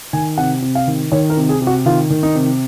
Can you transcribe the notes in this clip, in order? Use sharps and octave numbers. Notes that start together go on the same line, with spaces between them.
D#3 G#5
C3 F#5
C3
F5
D#3
D#3 C#5
A#4
C3
G#4
C3
F#4
D#3 F4
D#3
D#4
C3